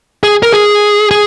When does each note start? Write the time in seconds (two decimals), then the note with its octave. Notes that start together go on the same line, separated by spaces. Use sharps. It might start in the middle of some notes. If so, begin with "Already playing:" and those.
0.23 G#4
0.43 A#4
0.53 G#4
1.11 G#4